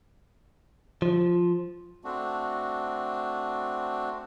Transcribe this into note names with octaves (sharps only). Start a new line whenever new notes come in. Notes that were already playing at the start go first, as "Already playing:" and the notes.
F3
A3 C4 D4 F#4